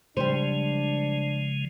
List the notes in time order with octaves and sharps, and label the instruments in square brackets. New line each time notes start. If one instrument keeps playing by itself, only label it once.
[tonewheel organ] C#3 F3 G#3 [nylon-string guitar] G3 C5 [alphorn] D4